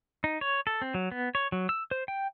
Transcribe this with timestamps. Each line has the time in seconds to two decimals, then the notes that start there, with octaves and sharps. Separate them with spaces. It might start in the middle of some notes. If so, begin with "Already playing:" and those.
0.24 D#4
0.41 C#5
0.67 A4
0.82 C4
0.94 F#3
1.12 B3
1.35 C#5
1.52 F#3
1.69 E6
1.91 C5
2.08 G5